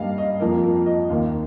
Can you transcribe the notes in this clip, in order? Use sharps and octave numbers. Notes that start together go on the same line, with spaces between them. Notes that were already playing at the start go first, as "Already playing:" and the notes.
Already playing: G2 G3 A#3 D#5 F5
D#5
F2 F3 A#3 A#4
A#4
D#5
D#2 D#3 A#3 F5